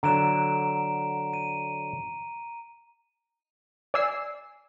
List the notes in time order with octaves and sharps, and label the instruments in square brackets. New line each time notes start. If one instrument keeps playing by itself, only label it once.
[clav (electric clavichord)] D3 F#3 [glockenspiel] A#5 D7 E7
[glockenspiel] D#7
[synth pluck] D5 G#5 E6 C7